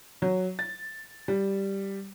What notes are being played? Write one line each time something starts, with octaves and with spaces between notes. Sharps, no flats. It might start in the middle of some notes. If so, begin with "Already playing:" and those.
F#3
A6
G3